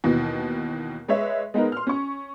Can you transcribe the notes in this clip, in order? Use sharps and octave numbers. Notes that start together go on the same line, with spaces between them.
D#2 B2 E3
G#3 B4 C#5 D#5 E5
G#3 B3 D#4 A#4
C6 F6
C#4 C#6